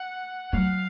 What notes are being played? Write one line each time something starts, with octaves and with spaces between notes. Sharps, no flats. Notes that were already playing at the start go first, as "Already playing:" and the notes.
Already playing: F#5
F#3 F5